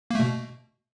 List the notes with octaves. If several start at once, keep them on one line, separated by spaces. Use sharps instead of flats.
B2 A3 A#3